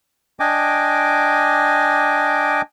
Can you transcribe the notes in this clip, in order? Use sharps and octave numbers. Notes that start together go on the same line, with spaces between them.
D4 D#5 G5 G#5 D6